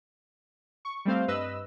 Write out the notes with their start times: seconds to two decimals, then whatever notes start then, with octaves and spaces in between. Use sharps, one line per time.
0.85 C#6
1.05 G3 A3 C4 C5 F5
1.28 G2 B4 D#5 E6